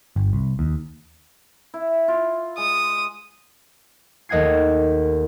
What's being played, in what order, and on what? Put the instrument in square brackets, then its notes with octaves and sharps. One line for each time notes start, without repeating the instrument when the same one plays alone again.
[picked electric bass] G1
C2
D#2
[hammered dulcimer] E4
F4
[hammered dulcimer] G#3 [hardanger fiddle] D#6
[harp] D#2 A3 D#5 F#5 G#6 C7